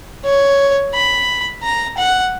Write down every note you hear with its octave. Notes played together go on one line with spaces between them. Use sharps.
C#5
B5
A#5
F#5